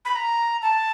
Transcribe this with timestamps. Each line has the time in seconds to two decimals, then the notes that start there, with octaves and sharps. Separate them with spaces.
0.05 B5
0.15 A#5
0.62 A5